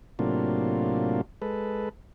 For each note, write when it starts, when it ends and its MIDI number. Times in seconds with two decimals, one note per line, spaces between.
0.19 1.21 45
0.19 1.21 48
0.19 1.21 54
0.19 1.21 58
0.19 1.21 62
0.19 1.21 65
1.42 1.89 56
1.42 1.89 69
1.42 1.89 71